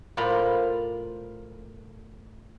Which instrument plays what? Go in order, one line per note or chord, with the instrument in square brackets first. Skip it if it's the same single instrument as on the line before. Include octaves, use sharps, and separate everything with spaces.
[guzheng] A2 F4 A#4 C5 D5 B5